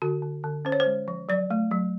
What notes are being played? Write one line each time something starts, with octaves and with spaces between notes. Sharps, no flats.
D3 F#4
D3
D3
C#4 C5
C#5
C5
G#3
F3
F#3 D5
A3
F#3